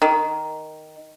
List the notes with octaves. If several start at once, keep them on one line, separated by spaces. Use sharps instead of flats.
D#3